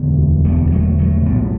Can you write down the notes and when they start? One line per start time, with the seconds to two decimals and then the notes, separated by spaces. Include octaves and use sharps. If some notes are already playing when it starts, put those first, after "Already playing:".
Already playing: E1 D2 D3 G3 B3
0.45 E1 D2 D3 G3 B3
0.71 F#3 A3
0.99 F#3 A3
1.26 B1 A2 G3 B3